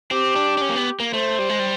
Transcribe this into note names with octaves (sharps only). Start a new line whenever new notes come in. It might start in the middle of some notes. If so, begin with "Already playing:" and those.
C4 G4
D4
D4
C#4
A#3
B3
A#3
A3 C5
G3
G#3
G3